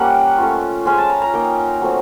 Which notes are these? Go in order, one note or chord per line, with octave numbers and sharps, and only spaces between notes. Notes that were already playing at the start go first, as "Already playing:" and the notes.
Already playing: G3 A#3 C#4 F#5
A3 C#4 F4
G#3 C#4 F4 G#5
A5
A#5
A#5
A#3 D#4 G5
F#3 A3 C4